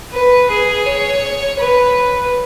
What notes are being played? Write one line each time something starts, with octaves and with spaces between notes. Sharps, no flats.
B4
G#4
C#5
B4